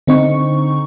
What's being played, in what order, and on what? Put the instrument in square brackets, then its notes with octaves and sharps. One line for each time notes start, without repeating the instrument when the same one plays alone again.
[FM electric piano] D3 C4 D#4 C#6